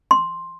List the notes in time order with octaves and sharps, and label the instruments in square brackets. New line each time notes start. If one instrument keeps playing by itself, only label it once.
[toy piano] C6